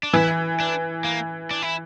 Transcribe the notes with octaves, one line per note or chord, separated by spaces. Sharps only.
D4
E3 E4
D4
A#3
D4
E4